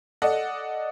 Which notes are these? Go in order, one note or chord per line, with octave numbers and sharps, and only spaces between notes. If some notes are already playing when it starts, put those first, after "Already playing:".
A4 D5 D#5 F#5